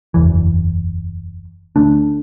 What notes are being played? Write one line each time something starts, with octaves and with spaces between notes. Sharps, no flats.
F#1 E2 E3
D2 D3 A3 D4